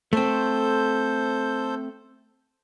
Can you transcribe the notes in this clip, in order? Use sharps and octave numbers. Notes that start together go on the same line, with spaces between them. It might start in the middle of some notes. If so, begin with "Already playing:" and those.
A3 C4 A4 C5 G6